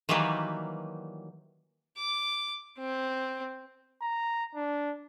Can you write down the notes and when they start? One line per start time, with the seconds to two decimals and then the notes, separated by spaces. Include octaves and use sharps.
0.09 D#3 E3 F#3 G3 A#3 B4
1.97 D6
2.78 C4
4.02 A#5
4.55 D4